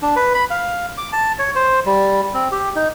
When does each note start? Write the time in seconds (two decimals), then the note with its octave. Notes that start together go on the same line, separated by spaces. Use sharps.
0.02 D4
0.16 B4
0.34 B5
0.50 F5
0.98 D6
1.13 A5
1.39 C#5
1.55 C5
1.86 G3
2.34 C4
2.52 G4
2.76 D#4